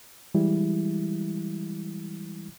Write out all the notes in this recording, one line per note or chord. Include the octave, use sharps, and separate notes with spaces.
E3 G3 G#3 E4